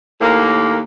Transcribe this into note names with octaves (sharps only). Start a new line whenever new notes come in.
D#2 A2 A#3